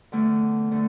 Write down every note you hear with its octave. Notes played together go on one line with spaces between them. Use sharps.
E2 D3 A3
D3 A3